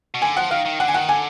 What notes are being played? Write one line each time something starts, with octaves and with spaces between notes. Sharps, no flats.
B2
D3 G#5
F3 F#5
D#3 F5
D#3
D3 F#5
G#5
D#3 F#5
D3 G#5